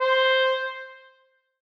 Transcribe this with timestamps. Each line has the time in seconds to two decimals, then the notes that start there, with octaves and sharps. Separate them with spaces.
0.01 C5